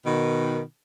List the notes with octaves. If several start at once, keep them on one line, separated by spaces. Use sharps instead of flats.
B2 D#3